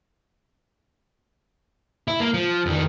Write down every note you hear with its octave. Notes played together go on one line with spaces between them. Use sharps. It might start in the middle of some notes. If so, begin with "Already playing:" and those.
E4
A#3
F3
F2 D#3